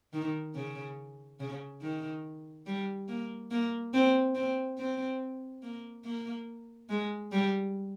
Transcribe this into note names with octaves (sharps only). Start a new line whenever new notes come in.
D#3
C#3
C#3
D#3
G3
A#3
A#3
C4
C4
C4
A#3
A#3
G#3
G3